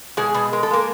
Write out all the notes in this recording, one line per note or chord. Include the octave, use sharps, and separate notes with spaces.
B2 G#3 G#4
B2
G#3 A#4
A4
G#3 A#3 A#4